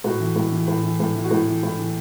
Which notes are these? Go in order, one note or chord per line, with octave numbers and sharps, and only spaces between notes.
A2 F#4
E3
A2
E3
A2
E3
A2
E3
F#4
A2 E4
E3
A2
E3